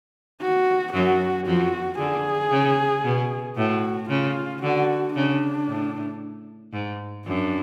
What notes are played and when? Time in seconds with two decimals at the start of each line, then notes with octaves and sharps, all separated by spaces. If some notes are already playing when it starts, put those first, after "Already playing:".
0.41 F#4
0.94 F#2 F#3 F#4
1.47 F2 F3 F#4
1.99 D3 G#4
2.52 C#3
3.04 B2
3.57 A2 F#4
4.09 C#3 F4
4.63 D3 F#4
5.15 C#3 D4
5.68 A2
6.73 G#2
7.27 F#2 D4